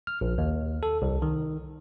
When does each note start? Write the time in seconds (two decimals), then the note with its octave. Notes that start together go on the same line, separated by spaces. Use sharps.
0.07 F6
0.21 A#1
0.38 D#2
0.83 A4
1.02 C2
1.22 D#3